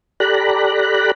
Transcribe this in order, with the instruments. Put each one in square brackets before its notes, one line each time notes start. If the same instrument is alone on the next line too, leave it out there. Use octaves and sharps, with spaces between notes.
[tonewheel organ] G4 A4 D5 A#5 B5 F#6